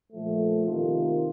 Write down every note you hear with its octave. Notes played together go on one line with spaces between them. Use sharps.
A#2 F3 A3
C3 D#3 A#3 F4